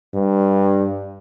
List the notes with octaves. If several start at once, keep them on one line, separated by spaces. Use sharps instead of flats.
G2